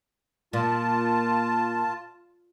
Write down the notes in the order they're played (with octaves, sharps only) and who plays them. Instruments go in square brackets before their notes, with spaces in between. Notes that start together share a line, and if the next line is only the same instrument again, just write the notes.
[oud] A#2 [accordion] F4 A5